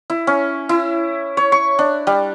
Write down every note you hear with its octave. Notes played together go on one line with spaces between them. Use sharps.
E4
C#4
E4
C#5
C#6
D4
G3